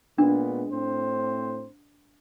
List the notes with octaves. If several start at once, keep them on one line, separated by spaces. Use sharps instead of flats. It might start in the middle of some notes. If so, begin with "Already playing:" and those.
A#2 G#3 B3 D4
A2 C4 C5